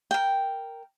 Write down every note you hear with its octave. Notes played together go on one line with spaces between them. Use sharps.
A#4 G5